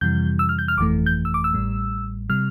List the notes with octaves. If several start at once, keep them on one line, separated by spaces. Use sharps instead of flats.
F2 C3 E3 G3 G6
E6
F6
G6
F6
G1 F2 E3 A3 D6
G6
E6
D6
E6
A1 A2 G3
C3 G3 F6